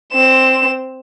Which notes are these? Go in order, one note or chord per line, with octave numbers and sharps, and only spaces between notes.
C4 E7